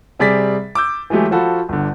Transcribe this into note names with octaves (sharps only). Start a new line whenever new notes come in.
C3 G3 G#4 D5 A6 B6
D6 E6 G6
E3 F#3 G#3 A3 G4
F3 F4 F#4 A4 B5
G1 D3